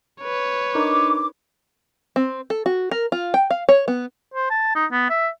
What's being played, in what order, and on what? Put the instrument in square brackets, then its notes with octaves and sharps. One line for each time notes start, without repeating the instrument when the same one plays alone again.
[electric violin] B4 C#5
[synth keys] D4 D#4 A#4 [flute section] D6
[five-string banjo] C4
A4
F#4
A#4
F4
G5
F5
C#5
B3
[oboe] C5
A5
D#4
B3
E5